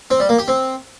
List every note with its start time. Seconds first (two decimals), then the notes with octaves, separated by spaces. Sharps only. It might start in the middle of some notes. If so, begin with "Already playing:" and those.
0.11 C4
0.20 G3
0.29 A#3
0.39 G4
0.48 C4